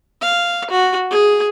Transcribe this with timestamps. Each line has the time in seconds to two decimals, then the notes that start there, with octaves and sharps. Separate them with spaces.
0.21 F5
0.70 F#4
1.11 G#4